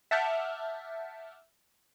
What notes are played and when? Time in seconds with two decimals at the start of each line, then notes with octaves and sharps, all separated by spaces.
0.11 E5 F#5 A5 D6 F6 G6